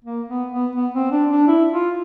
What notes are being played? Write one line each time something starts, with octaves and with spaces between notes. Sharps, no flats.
A#3
B3
B3
B3
C4
D4
D4
E4
F4